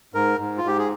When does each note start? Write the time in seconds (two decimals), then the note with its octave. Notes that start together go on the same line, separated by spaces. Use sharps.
0.14 G#2 A#4
0.39 G#2
0.58 F4
0.64 G#2 G4
0.78 G#4